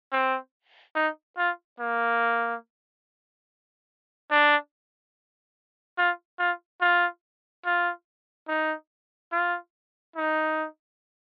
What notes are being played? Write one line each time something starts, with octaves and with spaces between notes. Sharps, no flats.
C4
D#4
F4
A#3
D4
F4
F4
F4
F4
D#4
F4
D#4